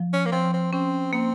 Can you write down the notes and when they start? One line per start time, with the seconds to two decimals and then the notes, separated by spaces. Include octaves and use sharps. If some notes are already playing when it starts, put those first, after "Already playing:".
Already playing: F3
0.13 C#4
0.26 A#3
0.32 F3 C4
0.53 C4
0.72 C4 C#4
1.13 A#3 C4